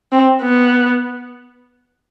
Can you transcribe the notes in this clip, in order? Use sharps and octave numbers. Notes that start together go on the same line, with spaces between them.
C4
B3